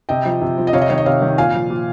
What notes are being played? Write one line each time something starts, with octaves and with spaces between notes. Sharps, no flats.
C3 D#5 G5
F3
C3
F3
D#5
C3 C#5 F5
D#5
D#3 C#5
D#5
C3 C#5 F5
D#3
A#2 F5 G#5
F3
A#2